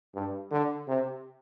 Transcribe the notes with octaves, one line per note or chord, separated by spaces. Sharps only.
G2
D3
C3